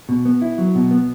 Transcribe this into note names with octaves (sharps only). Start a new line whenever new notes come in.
B2
B3
E4
F#3
B2
B3